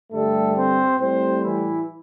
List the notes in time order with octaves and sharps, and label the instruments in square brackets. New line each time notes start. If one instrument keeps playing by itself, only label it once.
[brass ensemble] G2 D3 G3 A3 A4
C4 C5
A2 G3 C4 C5
E3 E4